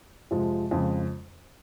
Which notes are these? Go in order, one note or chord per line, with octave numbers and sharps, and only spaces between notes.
F2 C3 F3 G#3
F2 C#3 G#3